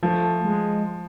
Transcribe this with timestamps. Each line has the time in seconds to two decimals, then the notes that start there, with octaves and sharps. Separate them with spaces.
0.03 F3 A3
0.45 G#3